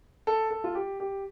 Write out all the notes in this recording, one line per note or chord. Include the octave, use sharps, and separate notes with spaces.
A4
A4
F4
G4
G4